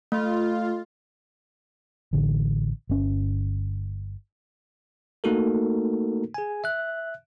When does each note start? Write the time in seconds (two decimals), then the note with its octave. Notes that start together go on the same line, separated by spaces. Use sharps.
0.12 A3 F4
2.13 A1 D3
2.89 G1 C#4
5.24 A3 A#3 D#4 F#4 A4 A#4
6.34 G#4 G#5
6.64 E5 F#6